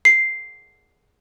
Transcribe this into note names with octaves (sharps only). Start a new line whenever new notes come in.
C7